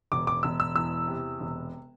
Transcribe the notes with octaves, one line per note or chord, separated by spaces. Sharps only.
E1 D6
D6
E1 E6
E6
E2 E6
C3
E1